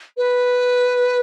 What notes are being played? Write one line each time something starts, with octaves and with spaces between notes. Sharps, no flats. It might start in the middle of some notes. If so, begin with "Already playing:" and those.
B4